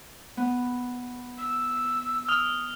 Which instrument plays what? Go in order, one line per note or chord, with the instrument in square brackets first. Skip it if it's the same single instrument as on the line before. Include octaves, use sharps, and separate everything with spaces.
[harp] B3
[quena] E6
[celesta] D#6 [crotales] F6 F7